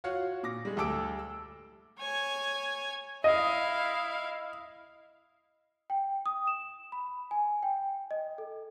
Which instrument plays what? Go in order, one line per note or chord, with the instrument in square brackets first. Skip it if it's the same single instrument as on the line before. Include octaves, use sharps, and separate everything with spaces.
[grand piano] F4 F#4 C#5 F5 F#5
A#2 D6 A#6
G3 G#3
D2 G3 A4 D6 E6 D7
E6
[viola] C#5 G#5
[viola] E4 F5 [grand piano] D#5
[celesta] G5
D#6
E7
B5
G#5
G5
D#5
A4